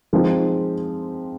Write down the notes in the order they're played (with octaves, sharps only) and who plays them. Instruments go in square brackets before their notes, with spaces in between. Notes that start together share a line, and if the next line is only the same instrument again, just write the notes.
[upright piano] F3 G#3 C4 D#4